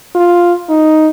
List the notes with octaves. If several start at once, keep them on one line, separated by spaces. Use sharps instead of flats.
F4
D#4